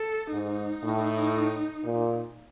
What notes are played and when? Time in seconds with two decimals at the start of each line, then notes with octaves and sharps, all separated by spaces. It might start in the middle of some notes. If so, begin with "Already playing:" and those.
Already playing: A4
0.32 G#2 D#4
0.83 A2
1.84 A#2